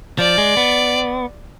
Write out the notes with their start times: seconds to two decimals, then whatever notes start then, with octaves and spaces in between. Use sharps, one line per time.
0.19 F3 D5
0.38 G#3
0.57 B3